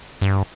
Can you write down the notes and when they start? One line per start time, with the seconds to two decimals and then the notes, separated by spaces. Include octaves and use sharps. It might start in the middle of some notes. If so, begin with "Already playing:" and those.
0.21 G2